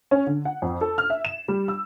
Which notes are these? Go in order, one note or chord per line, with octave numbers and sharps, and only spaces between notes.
C#4
D3
F#5
F2
A4
F6
E5
E7
G3
E6